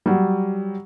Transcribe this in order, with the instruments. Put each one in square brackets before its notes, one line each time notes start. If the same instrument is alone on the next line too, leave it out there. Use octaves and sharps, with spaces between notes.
[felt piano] F#3 G3